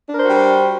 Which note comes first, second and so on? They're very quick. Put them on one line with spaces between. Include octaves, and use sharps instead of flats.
D4 A#4 C5 F#4 G3